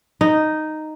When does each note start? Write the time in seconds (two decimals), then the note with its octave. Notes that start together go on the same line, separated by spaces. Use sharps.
0.21 D#4